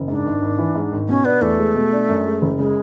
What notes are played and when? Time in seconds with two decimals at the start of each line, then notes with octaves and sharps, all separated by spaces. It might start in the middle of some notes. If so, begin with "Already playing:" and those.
Already playing: F#1
0.08 G#2 D4
0.25 G#1
0.42 G#1
0.58 E3
0.75 G#2
0.92 G#1
1.09 B2 C#4
1.25 B3 D4
1.41 E2 A3
1.58 G#3
1.75 B2
1.92 D4
2.09 F#2
2.26 G#3
2.42 F#1
2.58 C#3 G#3